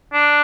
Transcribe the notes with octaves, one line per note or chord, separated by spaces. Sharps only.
D4